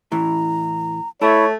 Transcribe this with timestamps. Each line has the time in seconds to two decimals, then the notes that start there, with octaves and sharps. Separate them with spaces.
0.12 A2 E3 A#5
1.22 A3 E4 C#5 B5